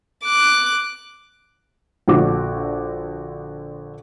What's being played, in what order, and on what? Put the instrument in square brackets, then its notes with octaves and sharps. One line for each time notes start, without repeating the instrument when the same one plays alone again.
[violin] D6 F#6
[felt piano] A#1 D3 F#4 D6